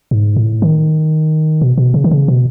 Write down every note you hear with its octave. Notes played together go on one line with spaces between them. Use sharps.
G#2
A2
D#3
B2
B2
C#3
D#3
C#3
B2